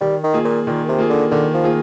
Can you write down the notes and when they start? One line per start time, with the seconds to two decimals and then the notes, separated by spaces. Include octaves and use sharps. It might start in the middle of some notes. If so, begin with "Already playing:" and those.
0.01 D#3 G3
0.24 D#3
0.33 A#3 F4 G#4
0.45 A#2
0.67 A#2 D#3
0.88 C3
0.99 A#3 F4 G#4
1.10 D3
1.31 D3 D#3
1.54 F3
1.64 A#3 F4 G#4